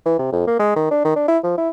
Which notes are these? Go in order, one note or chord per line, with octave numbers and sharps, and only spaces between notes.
E3
C3
F2
A#3
G#3
D#3
D4
D#3
D4
E4
F3
E4